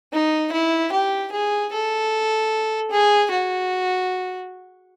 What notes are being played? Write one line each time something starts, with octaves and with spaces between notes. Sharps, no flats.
D#4
E4
G4
G#4
A4
G#4
F#4